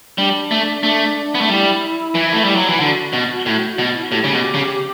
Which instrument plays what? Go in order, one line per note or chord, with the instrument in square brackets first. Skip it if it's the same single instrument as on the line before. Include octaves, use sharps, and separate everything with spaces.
[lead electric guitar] G3 [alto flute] D4
[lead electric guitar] A3
A3
B3
A3
[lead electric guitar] G3 [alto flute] E4
[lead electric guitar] E3
A3
G3
F#3
E3
[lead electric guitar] D3 [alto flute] F#4
[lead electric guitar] B2
A2
B2
[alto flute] E4
F#4
[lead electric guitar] A2 [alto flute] G4
[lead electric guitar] C#3
B2
C#3